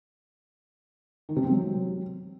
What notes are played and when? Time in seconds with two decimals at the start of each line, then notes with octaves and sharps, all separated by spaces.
1.29 D#3
1.36 C3
1.44 C4
1.52 F#3